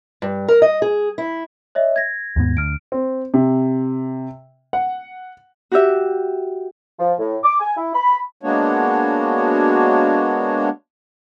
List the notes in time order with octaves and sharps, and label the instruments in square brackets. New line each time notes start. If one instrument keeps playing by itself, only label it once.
[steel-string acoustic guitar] G2
A#4
D#5
G#4
E4
[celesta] C#5 D#5 E5
G#6 A#6
[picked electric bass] D#2 G#2 B3
[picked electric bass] D2 [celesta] F6 D7
[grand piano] C4
C3
F#5
[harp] F#4 G4 E5
[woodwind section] F3
A2
D6
G#5
E4
B5
[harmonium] G#3 A#3 B3 D4 F#4 C#5